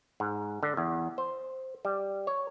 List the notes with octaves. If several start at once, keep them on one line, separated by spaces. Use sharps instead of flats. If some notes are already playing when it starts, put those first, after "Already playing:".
G#2
D3
E2
C5
G3
C#5